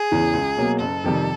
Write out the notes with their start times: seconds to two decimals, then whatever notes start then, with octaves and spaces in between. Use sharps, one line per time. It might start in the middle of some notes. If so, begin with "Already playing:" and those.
Already playing: G#4
0.12 E2 C#3 E3
0.34 C#2
0.57 B2 F#3 A#3
0.80 F#1 A4
1.04 F2 C3 D#3 G3